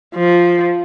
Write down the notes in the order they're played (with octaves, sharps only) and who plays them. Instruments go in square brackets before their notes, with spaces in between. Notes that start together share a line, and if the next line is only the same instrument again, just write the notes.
[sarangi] F3